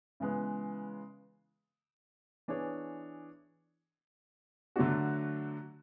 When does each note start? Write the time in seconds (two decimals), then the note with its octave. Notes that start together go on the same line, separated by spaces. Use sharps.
0.20 C#3 E3 G#3 B3
2.48 E3 B3 D4 G#4 C#5
4.76 D3 F#3 A3 D4 F#4